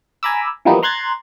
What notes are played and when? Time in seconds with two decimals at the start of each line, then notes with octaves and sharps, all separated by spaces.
0.23 G#5 A#5 B5 D6 E6
0.65 E3 F3 G3 A#3 B3 D#4
0.83 A#5 C6 F#6 G#6 A6